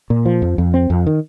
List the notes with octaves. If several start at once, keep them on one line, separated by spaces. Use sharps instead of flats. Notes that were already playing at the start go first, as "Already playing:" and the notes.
A#2
F3
F2
F2
C4
F2
D#3